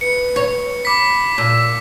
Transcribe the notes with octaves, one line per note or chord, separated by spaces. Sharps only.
B4 C#7
C#5
B5 D6 B6
A#2 E6